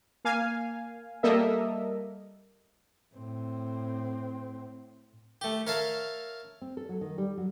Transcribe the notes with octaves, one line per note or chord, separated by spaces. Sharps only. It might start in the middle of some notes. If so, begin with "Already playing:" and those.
A#3 F5 G#5
G3 A#3 A4 A#4 D#5 E5
A2 C4
A3 G4
A#4 C#5 E5 F5 A5
C4
A4
F#3
D#3
G3
F#3